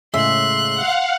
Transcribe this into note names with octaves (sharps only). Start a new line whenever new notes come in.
A2 C#3 G#3 E5 C6 F#6
F5 F#5